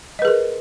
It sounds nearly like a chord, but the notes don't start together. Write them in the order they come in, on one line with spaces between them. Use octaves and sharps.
D#5 B4 G#4 A#4